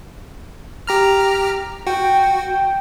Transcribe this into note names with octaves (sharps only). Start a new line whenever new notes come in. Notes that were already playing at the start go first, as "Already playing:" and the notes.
G4 A#5 F6
F#4 G5